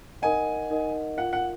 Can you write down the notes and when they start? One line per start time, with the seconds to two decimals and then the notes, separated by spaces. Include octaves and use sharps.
0.22 D#4 A#4 D#5 F#5 G#5
0.70 D#4 A#4 D#5 F#5
1.17 F4 A#4 F5 F#5
1.33 F#5